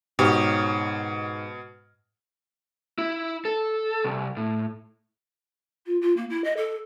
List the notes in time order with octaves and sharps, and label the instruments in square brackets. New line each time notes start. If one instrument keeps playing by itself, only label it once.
[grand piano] G#2 F6 [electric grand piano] B2 [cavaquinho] G4 C#5 D#5
[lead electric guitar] E4
A4
C2
A2
[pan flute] F4
F4
A#3
E4
D#5
A4